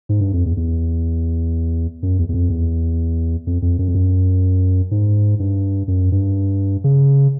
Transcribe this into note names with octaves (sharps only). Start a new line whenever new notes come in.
G#2
G2
F2
E2
E2
F#2
E2
E2
F2
E2
F2
F2
F#2
F2
F#2
G#2
G2
F#2
G2
C#3